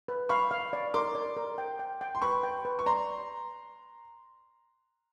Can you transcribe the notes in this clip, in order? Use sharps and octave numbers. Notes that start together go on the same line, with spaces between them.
B4
F5 B5 C#6
F5
D5
A#4 C6 D6
D5
A#4
G5
G5
G5
C6
B4 B5 C#6
G5
B4
C#6
D5 A#5 C6